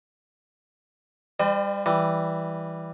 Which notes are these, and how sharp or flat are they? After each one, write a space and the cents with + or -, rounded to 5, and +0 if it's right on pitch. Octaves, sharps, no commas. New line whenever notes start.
G3 +25 C5 -35 D#5 -45
E3 +0 G3 +0